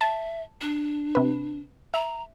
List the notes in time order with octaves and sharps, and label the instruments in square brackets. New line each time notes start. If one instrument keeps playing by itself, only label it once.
[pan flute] E5 [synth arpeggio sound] A5
[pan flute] D4
[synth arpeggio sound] C3 B4
[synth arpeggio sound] E5 [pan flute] A#5